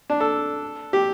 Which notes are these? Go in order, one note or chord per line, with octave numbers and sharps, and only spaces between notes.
D4
A4
G4